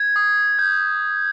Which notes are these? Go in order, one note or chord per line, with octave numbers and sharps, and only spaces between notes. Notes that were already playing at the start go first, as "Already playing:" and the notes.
Already playing: G#6
D#6
G6